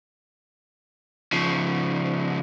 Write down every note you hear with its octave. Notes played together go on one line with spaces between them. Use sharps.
C#3 F3